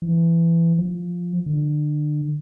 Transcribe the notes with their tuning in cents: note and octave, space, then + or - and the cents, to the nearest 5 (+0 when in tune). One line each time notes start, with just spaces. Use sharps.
E3 +20
F3 +5
D3 +30